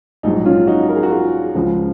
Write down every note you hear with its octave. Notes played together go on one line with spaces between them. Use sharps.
A#1 G#2 F#3 D#4
C#4 F4
D#4 F#4
A#4
G#4
F#4
F4 G#4
C#2 C#3 F3